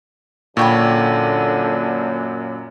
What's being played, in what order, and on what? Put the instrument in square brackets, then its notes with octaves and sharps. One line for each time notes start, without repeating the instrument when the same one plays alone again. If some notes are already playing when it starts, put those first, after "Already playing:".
[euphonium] F#2 [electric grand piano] A#2 [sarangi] D3 [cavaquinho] C#5 G5 B5